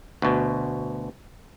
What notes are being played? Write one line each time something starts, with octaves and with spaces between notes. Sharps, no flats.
D2 B2